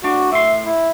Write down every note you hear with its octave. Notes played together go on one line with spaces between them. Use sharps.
A2 D4 F#4 D5
A2 E5 C6
E4